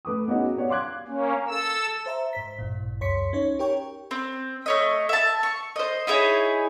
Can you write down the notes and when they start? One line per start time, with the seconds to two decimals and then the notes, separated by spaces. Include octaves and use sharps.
0.05 A3 B4 D6 D#6
0.28 B3 C#4 D#4 F#4 G#4
0.56 B3 G4 C#5 D5 F#5
0.69 F5 C6 D6 F#6 G#6
1.08 A#3 C#4
1.48 A4 E6
2.06 C5 E5 A#5
2.33 G#2 C5 B6
2.59 A1 G2 A#2
3.01 C#2 F#2 C#5 C6 B6 C#7
3.33 C#4 D#4 C#5
3.59 G4 A#4 C#5 G5 C#6
4.11 C4
4.66 A3 C#5 D#5
5.09 E5 A5
5.43 C#6
5.76 C5 D#5
6.07 D#4 E4 G#4 C#5